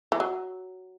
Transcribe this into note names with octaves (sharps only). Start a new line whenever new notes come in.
E3
F#3